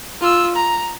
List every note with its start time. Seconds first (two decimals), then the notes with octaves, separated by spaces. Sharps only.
0.21 F4 E6
0.55 A#5